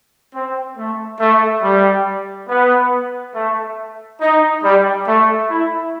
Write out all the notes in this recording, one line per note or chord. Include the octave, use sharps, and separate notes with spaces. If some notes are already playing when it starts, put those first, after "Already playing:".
C4
A3
A3
G3
B3
A3
D#4
G3
A3
E4